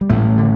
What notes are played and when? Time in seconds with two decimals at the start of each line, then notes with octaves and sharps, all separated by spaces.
0.01 G3
0.10 A1 A2 A3
0.38 D3